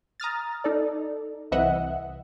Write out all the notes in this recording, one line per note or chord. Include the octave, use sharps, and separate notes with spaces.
A#5 D#6 F6 A6
D#4 A4 D5
C2 C3 E3 D#5 E5 F#5